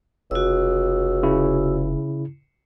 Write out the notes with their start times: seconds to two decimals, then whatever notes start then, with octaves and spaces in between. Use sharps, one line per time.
0.31 F1 C#2 F#4 E6
1.23 C#3 E4